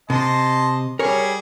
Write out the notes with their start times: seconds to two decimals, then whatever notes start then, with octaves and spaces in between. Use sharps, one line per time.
0.10 C3 D#5 A5 C6
0.99 G3 G#4 A#4 C#5